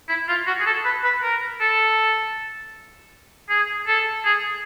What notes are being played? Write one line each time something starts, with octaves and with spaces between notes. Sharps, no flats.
E4
F4
F#4
G#4
A4
B4
B4
A#4
A4
G#4
A4
G#4